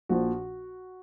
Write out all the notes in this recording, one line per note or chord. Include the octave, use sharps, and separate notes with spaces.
A#1 A#2 F3 F#4